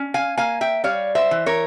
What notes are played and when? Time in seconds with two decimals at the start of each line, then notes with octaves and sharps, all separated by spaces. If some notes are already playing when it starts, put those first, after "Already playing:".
Already playing: C#4
0.14 F5 G#5
0.37 A#3 F5 G#5
0.61 E5 G5
0.84 G3 C#5 F5
1.15 C5 E5
1.31 E3
1.46 A#4 C#5